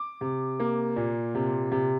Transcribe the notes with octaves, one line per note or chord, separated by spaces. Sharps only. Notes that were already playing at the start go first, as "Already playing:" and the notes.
Already playing: D6
C3
A#3
A#2
C3
C3